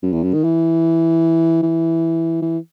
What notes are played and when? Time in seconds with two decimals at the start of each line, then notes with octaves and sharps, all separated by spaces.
0.03 F#2
0.13 E2
0.23 F#2
0.33 D#3
0.44 E3
1.63 E3
2.42 E3